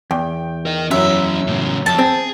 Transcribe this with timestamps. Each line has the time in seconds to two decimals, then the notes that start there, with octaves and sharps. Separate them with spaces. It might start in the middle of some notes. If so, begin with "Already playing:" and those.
0.11 E2 G5
0.66 A#4 D#5
0.91 F#2 F#3 C#4 E4 E5
1.47 A2 C#3
1.86 F2 E5 A5
1.99 C4 G#4